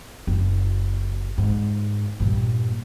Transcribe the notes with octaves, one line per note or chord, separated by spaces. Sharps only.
F#1
G#2
G2 A#2